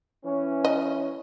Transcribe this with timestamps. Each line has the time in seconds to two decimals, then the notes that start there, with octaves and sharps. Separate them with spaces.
0.24 E3 C#4
0.65 D#5